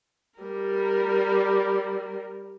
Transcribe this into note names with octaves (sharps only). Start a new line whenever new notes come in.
G3 A#4